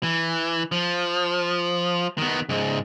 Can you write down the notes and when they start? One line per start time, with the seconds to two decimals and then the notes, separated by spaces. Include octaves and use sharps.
0.03 E3
0.72 F3
2.18 D#3 B3
2.49 C#2 G#2